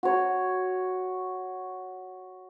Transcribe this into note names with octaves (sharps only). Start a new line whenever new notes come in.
F#4 C#5